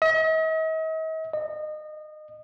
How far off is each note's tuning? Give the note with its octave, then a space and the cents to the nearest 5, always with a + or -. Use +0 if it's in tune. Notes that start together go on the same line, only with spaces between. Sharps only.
D#5 +45
D#5 -25